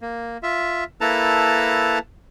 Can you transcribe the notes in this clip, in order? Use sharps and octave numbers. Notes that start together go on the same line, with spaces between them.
A#3
F4 E5
A#3 E4 A4 B4 A5 A#5